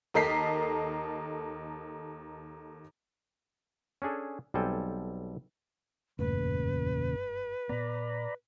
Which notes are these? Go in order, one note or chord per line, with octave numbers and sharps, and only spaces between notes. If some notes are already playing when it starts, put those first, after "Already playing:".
D#2 A4 A#4 D#5 B6 C7
C#4 D4 G#4 A4
B1 G3 C4 A4 G5 G#5
F#1 E2 G2 A#2 C#3 A3 B4
A#2 B3 D5 A#5 B5